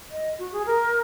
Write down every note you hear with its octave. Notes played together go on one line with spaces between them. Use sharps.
D#5
F#4
G#4
A#4